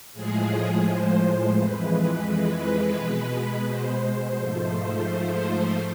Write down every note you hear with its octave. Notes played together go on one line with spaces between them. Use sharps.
A2 F3 G#3 G#4
C5
F2 E3 G#3 B4
B4
B2 G#3
C5
G#2 F3 A3